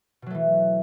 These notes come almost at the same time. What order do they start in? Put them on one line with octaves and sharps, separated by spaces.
B2 F#3 A3 E3